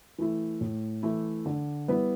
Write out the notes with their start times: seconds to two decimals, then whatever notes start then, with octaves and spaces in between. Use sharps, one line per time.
0.18 E3 A3 E4
0.61 A2
1.03 E3 A3 E4
1.46 D3
1.88 G3 B3 E4 B4